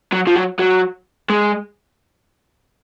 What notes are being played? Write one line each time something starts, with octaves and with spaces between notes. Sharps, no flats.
F#3
F3
F#3
F#3
G#3